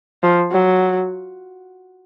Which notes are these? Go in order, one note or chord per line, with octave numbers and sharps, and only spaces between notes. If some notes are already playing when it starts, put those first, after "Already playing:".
F3
F#3